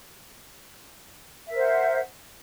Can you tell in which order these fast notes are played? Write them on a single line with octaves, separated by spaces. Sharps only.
E5 A#4 C5 F#5